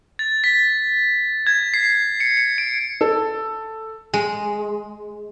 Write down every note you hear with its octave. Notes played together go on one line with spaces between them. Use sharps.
A6
B6
G#6
C7
C#7
C#7
D7
A4
G#3